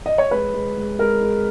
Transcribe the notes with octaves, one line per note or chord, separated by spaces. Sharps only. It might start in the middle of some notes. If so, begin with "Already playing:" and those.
D#5
C#5
G#3 B4
G#3
G#3
G#3 A#4
G#3